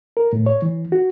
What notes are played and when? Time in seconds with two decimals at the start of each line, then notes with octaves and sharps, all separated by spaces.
0.17 A#4
0.33 A2
0.46 C#5
0.62 E3
0.92 F#4